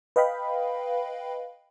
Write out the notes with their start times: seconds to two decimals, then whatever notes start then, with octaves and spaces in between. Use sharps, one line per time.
0.16 B4 D#5 F5 G5 B5